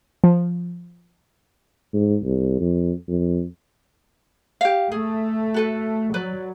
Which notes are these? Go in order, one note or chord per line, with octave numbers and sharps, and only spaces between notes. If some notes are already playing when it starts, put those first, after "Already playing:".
F3
G#2
C2
F2
F2
G4 F5
A3 G#4
F#4 A4 B4
F#3 B4 D5